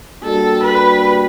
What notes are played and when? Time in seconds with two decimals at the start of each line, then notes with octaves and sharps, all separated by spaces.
0.23 G3 A#3 D4 F#4 A4
0.63 B4